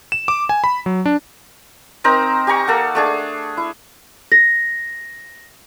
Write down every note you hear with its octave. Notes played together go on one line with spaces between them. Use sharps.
E7
D6
G#5
B5
F#3
D4
C4 D#4 A#4 A#5
G4 G#5 A#5 C#6
A#3 A4 F#5
A3 D4 G#4
E4
A#6